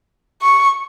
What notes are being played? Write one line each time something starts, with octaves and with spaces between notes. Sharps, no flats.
C#6